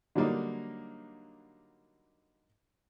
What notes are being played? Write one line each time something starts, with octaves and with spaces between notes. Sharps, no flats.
D3 F#3 G3 A#3 D4 D#4